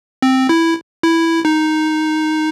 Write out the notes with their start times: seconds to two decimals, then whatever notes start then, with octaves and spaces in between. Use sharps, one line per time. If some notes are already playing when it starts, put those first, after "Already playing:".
0.22 C4
0.49 E4
1.03 E4
1.45 D#4